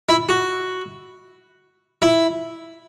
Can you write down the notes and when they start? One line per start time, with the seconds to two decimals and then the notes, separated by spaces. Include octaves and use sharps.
0.09 E4
0.29 F#4
2.02 E4